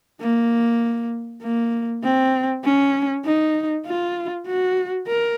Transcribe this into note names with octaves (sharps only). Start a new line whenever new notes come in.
A#3
A#3
C4
C#4
D#4
F4
F#4
A#4